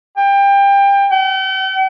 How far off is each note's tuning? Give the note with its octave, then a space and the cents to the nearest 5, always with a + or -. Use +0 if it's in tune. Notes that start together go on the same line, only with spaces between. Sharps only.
G5 +25
G5 -45